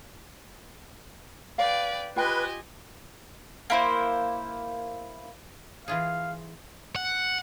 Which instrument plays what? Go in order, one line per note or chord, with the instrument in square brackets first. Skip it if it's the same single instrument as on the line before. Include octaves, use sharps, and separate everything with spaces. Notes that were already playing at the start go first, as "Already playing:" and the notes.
[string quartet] B4 D5 G5 [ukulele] F5
[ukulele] F4 G5 [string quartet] G4 D#5 G#5 [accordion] B4
[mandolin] A#3 E4 C5
[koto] E3 F4 G#4 [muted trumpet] F5
[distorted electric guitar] F#5